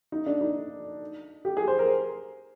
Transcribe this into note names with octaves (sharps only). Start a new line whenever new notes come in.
D#4
D4
D#4
G4
G#4
C5
A#4